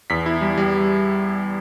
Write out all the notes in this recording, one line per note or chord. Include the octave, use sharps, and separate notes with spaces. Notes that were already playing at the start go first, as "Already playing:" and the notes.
E2 B6
E4
G3
G3